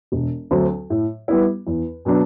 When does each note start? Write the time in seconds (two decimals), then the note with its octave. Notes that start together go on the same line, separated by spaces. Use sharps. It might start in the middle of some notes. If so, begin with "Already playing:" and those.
0.12 E1
0.51 D2 D3 F#3 C4
0.90 A2
1.28 G3 B3 E4
1.67 E2
2.05 B2 F#3 B3 D4